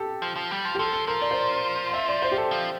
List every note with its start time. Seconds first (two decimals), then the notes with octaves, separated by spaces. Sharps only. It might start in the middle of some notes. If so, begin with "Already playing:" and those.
Already playing: G4 A4
0.22 F3
0.36 F3
0.51 G3
0.65 F3
0.75 G4
0.78 F3 A4
0.93 A4
1.07 F3 A#4
1.21 D5
1.31 C5
1.40 D5
1.89 F5
1.93 E5
2.08 D5
2.22 C5
2.32 G4
2.37 A4
2.51 F3